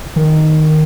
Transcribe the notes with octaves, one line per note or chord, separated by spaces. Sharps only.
D#3